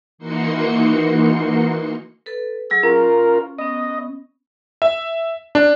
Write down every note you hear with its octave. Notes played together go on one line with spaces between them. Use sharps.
E3 A#3 D#4 F#4 C6 C#7
A4 B4
F#3 G#4 E6
C#4 F4 A#4
B3 C#4 D#5
E5
D4